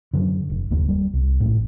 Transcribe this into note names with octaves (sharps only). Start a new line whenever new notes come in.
F#2 D3
F1
F#1 D#2 A#3
G3
C2
A1 A2